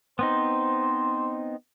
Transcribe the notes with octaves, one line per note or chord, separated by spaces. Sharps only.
B3 C4 D#4 C5